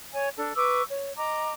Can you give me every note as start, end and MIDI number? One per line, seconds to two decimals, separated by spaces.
0.13 0.28 73
0.13 0.28 80
0.37 0.52 62
0.37 0.52 69
0.56 0.83 71
0.56 0.83 85
0.56 0.83 86
0.56 0.83 88
0.90 1.11 73
1.17 1.53 75
1.17 1.53 82
1.17 1.53 86